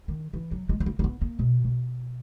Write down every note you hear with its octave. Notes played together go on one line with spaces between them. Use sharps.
D#3
E3
F#3
G#3
B3
A#3
A#3
B3
A#3
B2
B2